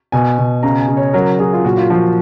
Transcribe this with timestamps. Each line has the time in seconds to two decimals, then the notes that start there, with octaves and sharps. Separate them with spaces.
0.12 B2 G#5
0.39 B2
0.63 C#3 A#5
0.80 G#5
0.88 C#3
0.97 C#5
1.13 F#3 A#4
1.39 F#3 G#4
1.53 F4
1.65 A#2 F#4
1.77 F4
1.90 F3 F#4